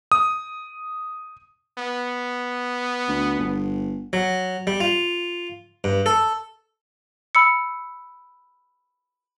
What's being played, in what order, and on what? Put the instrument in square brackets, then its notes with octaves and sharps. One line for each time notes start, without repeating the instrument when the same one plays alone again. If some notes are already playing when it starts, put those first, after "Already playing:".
[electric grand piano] D#6
[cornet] B3
[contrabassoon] D2
G1
[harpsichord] F#3
G3
F4
G2
A4
[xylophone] B5 E6 C#7